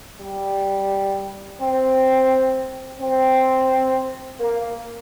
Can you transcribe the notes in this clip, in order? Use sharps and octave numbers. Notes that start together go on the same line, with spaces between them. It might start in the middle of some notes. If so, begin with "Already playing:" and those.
G3
C4
C4
A#3